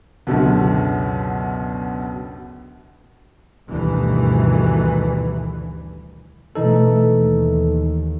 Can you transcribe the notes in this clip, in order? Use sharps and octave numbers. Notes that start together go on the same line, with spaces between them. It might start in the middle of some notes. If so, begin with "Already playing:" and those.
C#2 F#2 B2 D3
D2 G2 B2 D#3 E3
B2 E3 A3 D#4 A4
D#2